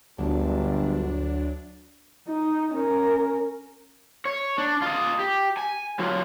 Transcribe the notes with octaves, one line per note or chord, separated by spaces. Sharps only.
G1 D2 F#3 D4
D#4
C#4 A#4
C#5
D4
F4 D#5
G4
G#5
F#3 F4